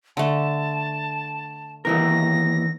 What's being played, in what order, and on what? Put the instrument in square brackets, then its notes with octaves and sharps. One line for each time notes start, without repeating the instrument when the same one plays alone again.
[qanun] D3 A3 [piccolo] A5
[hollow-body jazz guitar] D#2 E3 A#4 [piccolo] A#6